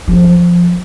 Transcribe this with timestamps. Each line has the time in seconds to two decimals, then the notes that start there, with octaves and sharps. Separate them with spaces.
0.07 F3